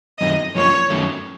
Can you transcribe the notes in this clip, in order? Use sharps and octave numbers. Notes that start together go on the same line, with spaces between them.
F#2 D#3 F#3 A3 C4 D#5
F#2 F3 A#3 C#4 C#5
F#2 D#3 F#3 A3 C#4